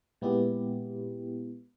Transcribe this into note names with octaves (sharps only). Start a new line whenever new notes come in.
A#2 G#3 B3 E4 G4